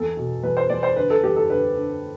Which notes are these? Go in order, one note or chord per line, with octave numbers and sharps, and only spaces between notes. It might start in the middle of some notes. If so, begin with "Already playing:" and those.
Already playing: E2 A4
B2
E2 B4
C5
E2 D5
C5
D3 B4
A4
E2 G4
A4
D3 B4
D3